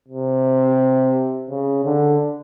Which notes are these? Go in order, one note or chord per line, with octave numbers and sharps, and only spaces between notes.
C3
C#3
D3